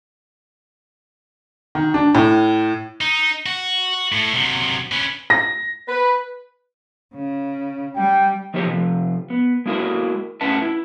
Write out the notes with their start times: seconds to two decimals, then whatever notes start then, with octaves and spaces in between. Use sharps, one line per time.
1.75 D#3
1.94 D4
2.15 A2
3.01 D#4
3.46 F#4
4.12 A2 A3
4.34 C3 F#3
4.92 C#4 B4
5.30 A#6
5.88 B4
7.15 C#3
7.96 G3 G5
8.54 E3 F3 A#3 D#4 G4 C#5
8.66 C3 F3
9.30 B3
9.66 G#3 A#3 E4 F#4 A#4
10.41 A2 C#4 B4 E5 F#5 A5
10.62 E4